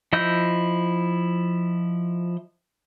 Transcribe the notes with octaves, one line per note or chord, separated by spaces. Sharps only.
F3 E4 D#5 E6 G6